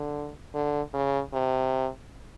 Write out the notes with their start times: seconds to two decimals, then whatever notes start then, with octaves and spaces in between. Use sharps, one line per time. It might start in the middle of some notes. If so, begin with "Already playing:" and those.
Already playing: D3
0.55 D3
0.94 C#3
1.33 C3